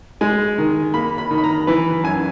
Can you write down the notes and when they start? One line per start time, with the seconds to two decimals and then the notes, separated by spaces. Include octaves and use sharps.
0.21 G#3 G#5
0.58 D#3
0.94 A#3 B5
1.18 B5
1.31 D#3
1.38 B5
1.44 A#5
1.67 E3 B4
2.04 F#2 G#5